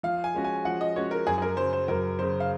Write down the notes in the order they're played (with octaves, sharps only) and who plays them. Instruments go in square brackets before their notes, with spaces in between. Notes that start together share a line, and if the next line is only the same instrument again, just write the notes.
[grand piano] F3 [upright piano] F5
[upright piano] G#5
[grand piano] G#3 C#4 F#4
[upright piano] G#5
[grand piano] F3 [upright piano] F#5
[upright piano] D#5
[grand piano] G#3 C#4 F#4 [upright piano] C#5
[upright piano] A#4
[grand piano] F#2 [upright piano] G#4
[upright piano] G#4
A#4
[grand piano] C#3 F#3 [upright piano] C5
[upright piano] C5
[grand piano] F#2 [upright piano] A#4
[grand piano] C#3 F#3 [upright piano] C5
[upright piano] F5